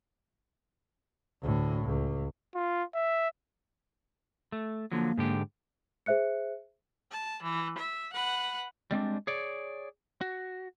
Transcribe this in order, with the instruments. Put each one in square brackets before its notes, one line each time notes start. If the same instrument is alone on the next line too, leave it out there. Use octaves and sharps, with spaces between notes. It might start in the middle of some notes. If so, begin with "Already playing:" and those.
[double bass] D2 A2
C#2
[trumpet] F4
E5
[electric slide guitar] A3
[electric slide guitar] D3 F3 F#3 [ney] A#3
[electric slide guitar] G#2 D3 G4
[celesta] G#4 C5 E5 F#6 C#7
[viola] A5
E3
E5
B4 F#5
[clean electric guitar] G3 G#3 C4 D4
G#4 C#5 D5
F#4